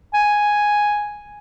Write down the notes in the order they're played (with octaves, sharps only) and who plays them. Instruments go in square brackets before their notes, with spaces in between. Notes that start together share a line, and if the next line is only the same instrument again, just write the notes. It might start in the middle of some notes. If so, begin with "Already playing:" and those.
[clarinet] G#5